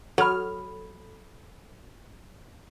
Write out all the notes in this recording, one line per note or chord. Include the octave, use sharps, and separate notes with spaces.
F#3 F#4 A4 B5 F6